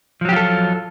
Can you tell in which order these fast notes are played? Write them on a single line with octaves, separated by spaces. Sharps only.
F3 F#3 G4 F4 A4